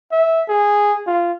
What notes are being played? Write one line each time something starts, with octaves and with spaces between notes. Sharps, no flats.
E5
G#4
F4